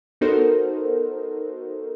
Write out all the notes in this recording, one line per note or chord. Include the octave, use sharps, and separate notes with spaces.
B3 D#4 F#4 A4 A#4 C5